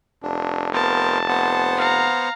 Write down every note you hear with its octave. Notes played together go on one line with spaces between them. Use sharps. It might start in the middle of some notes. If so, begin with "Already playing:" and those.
F1 D4
B3 A#4 C5 A5
B3 C5 F#5
F5 A#5